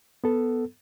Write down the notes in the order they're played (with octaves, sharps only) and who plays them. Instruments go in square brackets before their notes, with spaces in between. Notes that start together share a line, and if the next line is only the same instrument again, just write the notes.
[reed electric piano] B3 A4